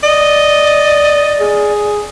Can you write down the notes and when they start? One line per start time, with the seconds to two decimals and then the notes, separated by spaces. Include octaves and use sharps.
0.03 D5 D#5
1.40 G#4